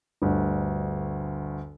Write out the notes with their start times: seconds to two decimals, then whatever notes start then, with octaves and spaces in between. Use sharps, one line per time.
0.22 G1 D2